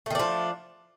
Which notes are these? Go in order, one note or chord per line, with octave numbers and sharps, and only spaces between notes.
D#3 F3 A3 D4